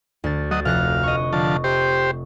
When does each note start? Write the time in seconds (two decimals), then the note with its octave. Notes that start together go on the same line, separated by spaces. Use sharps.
0.24 D2 A6
0.51 F#3 D#5 A6
0.65 F1 F5 F#6 A#6
1.03 D#5 C#6
1.33 D3 F3 A5
1.64 G4 C5